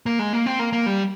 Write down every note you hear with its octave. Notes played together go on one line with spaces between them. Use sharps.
A#3
G#3
A#3
C4
A#3
A#3
G3